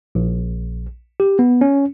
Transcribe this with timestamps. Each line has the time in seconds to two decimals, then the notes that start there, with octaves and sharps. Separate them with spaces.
0.15 A#1
1.20 G4
1.39 B3
1.61 C#4